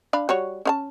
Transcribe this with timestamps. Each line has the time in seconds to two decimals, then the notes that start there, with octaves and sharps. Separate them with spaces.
0.13 D4 F5 B5
0.29 G3 F#4 C#5
0.65 C#4 F5 A5